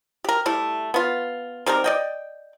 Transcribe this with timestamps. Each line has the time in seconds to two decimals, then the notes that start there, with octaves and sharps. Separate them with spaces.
0.24 G4 A#4
0.46 G3 A3 E4
0.94 B3 F4
1.66 D#3 G3 C4 A#4
1.84 D5 D#5 G5